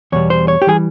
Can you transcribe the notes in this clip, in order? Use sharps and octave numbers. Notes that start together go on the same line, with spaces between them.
E2 B2 G3 C#5
C5
C#5
G4
E3 G3 G#4